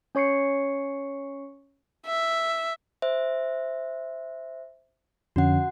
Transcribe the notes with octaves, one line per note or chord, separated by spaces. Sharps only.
C#4 C#5 C#6 C7 C#7
E5
C5 E5
F2 D3 C#4 F#4 F#5